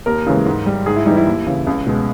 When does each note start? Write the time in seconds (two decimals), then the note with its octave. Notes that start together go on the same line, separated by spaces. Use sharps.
0.06 D#2 A#4
0.27 C#3 E3 G#3
0.46 G#2
0.66 G3
0.86 G#2 G#4
0.96 E4
1.06 E3 G3 D#4
1.17 E4
1.27 D#2
1.46 C#3 E3
1.67 C#2
1.87 B2 G#3